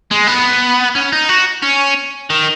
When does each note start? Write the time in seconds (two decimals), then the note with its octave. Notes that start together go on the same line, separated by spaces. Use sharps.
0.11 G#3
0.27 B3
0.95 C#4
1.12 D#4
1.29 F#4
1.63 C#4
2.30 D#3